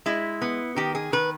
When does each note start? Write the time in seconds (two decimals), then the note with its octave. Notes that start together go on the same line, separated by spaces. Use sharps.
0.06 G#3 E4
0.42 B3
0.76 D#3 G4
0.95 G#4
1.12 D#3 B4